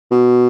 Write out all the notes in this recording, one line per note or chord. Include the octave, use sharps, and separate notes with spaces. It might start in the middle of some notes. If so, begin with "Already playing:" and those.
B2